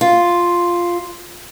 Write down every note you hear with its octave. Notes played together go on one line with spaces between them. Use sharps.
F4